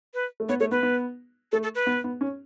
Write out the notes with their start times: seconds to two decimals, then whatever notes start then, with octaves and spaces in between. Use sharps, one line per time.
0.14 B4
0.40 A3
0.49 B3 C#5
0.60 A3 C#5
0.71 B3 B4
0.83 B3
1.52 A3 A4
1.63 A4
1.75 B4
1.87 B3
2.04 B3
2.21 C#4